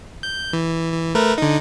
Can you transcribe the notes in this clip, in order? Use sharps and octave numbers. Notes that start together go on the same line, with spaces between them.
G6
E3
E3
A3 A#4 B4
D3 D#4